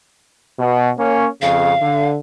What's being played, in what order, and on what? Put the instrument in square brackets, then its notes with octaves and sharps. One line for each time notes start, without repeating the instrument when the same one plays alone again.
[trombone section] B2
A#3 C#4
[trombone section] F2 C#3 [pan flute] F5
[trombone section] D3